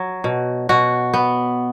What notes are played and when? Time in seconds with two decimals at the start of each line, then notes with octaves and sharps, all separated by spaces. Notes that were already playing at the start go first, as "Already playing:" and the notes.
Already playing: F#3
0.24 B2
0.69 B2 F#4
1.14 B3